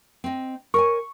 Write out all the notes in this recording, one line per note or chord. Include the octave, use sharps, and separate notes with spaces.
C4 D#5
A#4 C#5 G#5 C#6